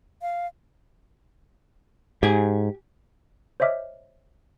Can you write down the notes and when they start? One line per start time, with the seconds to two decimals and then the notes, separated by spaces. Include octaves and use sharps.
0.22 F5
2.23 G#2 G4 G#5
3.60 C5 C#5 D#5 E5 D6 F6